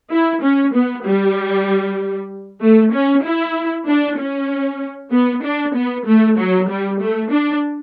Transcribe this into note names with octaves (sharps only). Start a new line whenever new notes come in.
E4
C#4
B3
G3
A3
C#4
E4
D4
C#4
B3
D4
B3
A3
F#3
G3
A3
D4